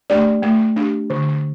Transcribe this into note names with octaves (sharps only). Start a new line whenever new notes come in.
A3 D4 G4 D5
A3
D4 G4
D3